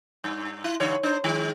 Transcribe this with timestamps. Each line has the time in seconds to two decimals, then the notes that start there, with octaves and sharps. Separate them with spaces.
0.24 G2
0.64 E4
0.80 G2 D3 C#5
1.03 D4 C5
1.24 D#3 G#3